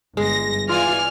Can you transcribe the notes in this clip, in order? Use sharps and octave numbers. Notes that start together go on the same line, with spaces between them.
G1 G#3 A#6
E3 F4 D5 G#5 F6